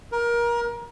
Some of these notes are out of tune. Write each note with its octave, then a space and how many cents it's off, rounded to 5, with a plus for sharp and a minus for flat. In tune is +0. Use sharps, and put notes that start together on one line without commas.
A#4 +25